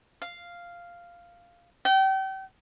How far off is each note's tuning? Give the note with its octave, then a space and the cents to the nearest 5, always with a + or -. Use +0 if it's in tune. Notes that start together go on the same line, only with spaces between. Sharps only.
F5 -5
G5 -35